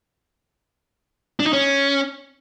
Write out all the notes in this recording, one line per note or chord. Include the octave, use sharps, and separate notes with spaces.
D4
D#4
C#4